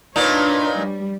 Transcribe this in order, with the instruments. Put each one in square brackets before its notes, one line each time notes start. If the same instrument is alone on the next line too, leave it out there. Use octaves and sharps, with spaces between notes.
[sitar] A#2 D#4 [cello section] D4 B4 C#5
[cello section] G3